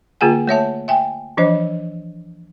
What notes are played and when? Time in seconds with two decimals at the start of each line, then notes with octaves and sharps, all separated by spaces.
0.21 D3 A#3 F4 G#4 F#5 G#5
0.47 A3 C#5 E5 A5
0.88 E5 G5 G#5
1.37 E3 F3 D4 C5 D#5